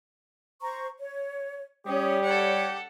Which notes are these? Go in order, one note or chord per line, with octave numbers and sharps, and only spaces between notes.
C5 A#5 C#6
C#5
G3 C#4 G4 C#5 D#6
A4 C#5 F#5